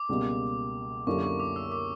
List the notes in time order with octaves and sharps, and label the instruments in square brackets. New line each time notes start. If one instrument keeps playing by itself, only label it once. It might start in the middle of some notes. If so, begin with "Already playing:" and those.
Already playing: [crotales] D6
[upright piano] C#2 B2 G3 A#3
[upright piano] F#2 D3 A#3 E4 G4 [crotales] C#6
[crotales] C#6
D6
E6
D6